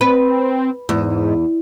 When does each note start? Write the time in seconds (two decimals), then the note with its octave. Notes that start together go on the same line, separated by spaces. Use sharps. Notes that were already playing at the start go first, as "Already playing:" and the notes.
0.01 C4 B4
0.89 E2 G#2